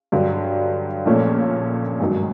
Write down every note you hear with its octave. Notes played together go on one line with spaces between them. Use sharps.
G2 D3 F#3
A#1 A#2 F3 A3 C#4
G#1 G2 D#3 F#3